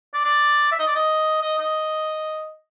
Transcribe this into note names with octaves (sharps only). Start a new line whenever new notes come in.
D5
D5
E5
D#5
D5
D#5
D#5
D#5